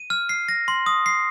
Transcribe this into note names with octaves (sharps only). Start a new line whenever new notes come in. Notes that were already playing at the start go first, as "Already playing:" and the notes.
Already playing: D#7
F6
C7
A#6
C6
D#6
C7